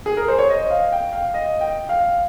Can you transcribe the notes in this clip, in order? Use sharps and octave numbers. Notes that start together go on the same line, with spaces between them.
G#4
A#4
C5
C#5
D#5
F5
G5
F5
D#5
G5
F5